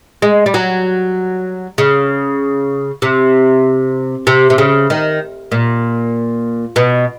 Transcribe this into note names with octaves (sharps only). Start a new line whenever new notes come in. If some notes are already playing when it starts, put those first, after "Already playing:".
G#3
G3
F#3
C#3
C3
C3
C3
C#3
D#3
A#2
B2